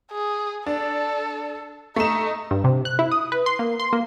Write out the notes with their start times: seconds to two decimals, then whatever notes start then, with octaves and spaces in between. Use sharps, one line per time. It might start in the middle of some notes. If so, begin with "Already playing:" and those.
0.11 G#4
0.66 D4 A4
1.96 A3 D#4 E7
2.51 G2
2.64 C3
2.85 F#6
2.99 E4
3.12 D#6
3.32 B4
3.46 C6
3.59 A#3
3.80 C6
3.93 A#3